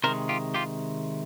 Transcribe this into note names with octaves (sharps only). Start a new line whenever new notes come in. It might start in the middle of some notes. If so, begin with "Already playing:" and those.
C3 D#3 G#3 A#4 C5
F4 G4
F4 G4